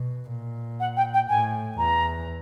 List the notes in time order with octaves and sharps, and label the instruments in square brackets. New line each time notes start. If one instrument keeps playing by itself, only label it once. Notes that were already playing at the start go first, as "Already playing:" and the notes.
Already playing: [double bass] B2
A#2
[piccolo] F#5
G5
G5
[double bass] A2 [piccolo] G#5
[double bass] E2 [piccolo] A#5